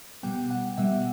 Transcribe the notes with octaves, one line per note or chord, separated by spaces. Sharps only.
B2 G3 B3 G5
F#5
B2 G3 B3 E5